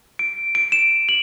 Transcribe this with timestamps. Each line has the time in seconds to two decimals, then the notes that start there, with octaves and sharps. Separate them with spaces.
0.19 D7
0.55 D7
0.72 E7
1.09 F#7